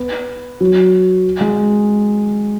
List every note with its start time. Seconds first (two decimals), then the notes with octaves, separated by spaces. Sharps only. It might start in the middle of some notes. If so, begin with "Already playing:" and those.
Already playing: B3
0.61 F#3
1.41 G#3